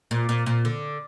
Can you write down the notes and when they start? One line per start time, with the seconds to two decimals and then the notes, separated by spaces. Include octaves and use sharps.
0.11 A#2
0.29 A#2
0.46 A#2
0.65 D3